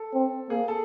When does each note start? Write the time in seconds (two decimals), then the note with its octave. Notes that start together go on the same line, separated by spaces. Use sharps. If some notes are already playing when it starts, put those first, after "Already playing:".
Already playing: A4
0.14 C4
0.50 A#3 G#4
0.68 A4